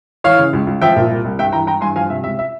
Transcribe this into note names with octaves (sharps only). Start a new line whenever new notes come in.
E3 C#5 F5
C#3
C#2
C#2
F3 E5 G5
A#2
C2
C2
G2 E5 G5
E3 G5 A#5
E3 G5 A#5
G2 G#5 C6
F3 F5 G#5
C3 E5
C#2 E5
E5